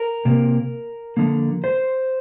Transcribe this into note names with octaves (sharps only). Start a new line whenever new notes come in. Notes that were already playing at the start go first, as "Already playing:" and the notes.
Already playing: A#4
C3 A#3
D3 F3 A#3
C5